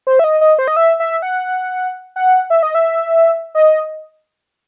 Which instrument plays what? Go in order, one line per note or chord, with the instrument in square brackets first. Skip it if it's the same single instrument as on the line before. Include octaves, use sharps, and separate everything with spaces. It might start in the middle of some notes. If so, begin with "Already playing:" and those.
[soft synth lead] C5
E5
D#5
D#5
C5
D#5
E5
E5
F#5
F#5
E5
D#5
E5
D#5